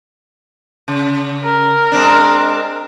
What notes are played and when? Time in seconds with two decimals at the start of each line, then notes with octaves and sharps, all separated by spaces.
0.88 C#3
1.44 A#4
1.92 G#3 C4 D4